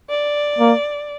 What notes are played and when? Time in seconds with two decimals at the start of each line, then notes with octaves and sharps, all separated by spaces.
0.10 D5
0.59 A#3